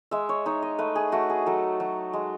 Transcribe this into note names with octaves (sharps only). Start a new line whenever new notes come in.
G#3 E5
C#5
D#4 C#5
D#5
A3 B4
G#4
A3 F#4
G#4
F#3 A4
F#3
G#3